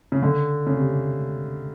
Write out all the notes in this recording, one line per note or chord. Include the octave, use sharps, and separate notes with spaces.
C#3
D3
C#3
C3